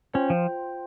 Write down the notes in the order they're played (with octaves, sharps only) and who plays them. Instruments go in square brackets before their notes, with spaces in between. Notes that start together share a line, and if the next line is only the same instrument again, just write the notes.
[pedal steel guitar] C#4 [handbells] F4 C5 G5
[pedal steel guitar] F3